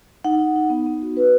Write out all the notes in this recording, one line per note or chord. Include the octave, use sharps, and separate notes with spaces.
D#4 F#5
D#4
D#4
B3
B3
F#4
F#4 B4